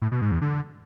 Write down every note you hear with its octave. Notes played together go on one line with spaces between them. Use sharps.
A2
B2
G#2
E2
D3